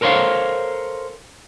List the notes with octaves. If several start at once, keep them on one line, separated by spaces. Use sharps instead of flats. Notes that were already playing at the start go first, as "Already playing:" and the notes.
A4 A#4 C5 C#5 F5